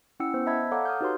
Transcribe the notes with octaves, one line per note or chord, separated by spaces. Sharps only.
C#4 E4 F#5 G5 E6 C#7
B3 C5
D#5 E5 A5 B5 E6 G#6
A4 C#5 F5 F#5 A#5 D6
D#6 F6 G6
D#4 F#4 G4 B4 C#5 C6